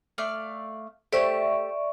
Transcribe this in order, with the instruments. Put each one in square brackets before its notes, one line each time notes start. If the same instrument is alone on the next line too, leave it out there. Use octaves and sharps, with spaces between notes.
[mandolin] A3 D5 F5
[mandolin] A3 G4 [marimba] A4 C5 [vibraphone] D5 E5 C#6